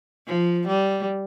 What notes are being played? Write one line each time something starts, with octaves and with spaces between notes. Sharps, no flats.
F3
G3